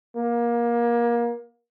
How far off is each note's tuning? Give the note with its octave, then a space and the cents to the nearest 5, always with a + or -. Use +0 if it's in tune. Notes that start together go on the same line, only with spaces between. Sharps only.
A#3 +25